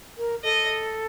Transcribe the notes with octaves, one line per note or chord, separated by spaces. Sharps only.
A#4
A4 D#5